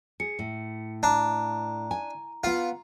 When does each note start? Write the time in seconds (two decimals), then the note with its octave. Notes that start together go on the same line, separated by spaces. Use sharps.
0.20 G#4 C#7
0.39 A2
1.03 D4 A#5
1.91 G#5
2.44 B3 F4 F#5